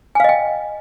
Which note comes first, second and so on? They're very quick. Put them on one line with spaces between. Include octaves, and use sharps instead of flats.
G#5 F5 D#5 G5